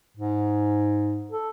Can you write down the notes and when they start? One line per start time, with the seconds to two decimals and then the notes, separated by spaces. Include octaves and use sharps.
0.17 G#2
1.31 A4